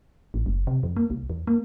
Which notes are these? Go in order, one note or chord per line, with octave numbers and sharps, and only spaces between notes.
A1
F#1
C3
F2
A#3
C2
E2
A#3